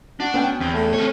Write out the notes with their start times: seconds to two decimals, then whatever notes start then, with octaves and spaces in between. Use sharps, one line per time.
0.20 D4 F#4
0.34 B3 C#4 G5
0.60 E2 C4
0.74 A3
0.94 C4 C#5